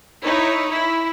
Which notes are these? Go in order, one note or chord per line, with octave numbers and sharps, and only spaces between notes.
D#4 E4 C#5
E4